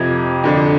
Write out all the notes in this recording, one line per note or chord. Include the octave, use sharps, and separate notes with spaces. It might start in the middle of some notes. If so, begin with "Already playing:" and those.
Already playing: F2 C3 F3 G#6
F2 D3 F3